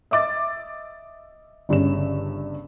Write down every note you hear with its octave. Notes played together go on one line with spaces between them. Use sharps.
D#5 E5 D6 A6
G1 G2 C#3 C#4 E7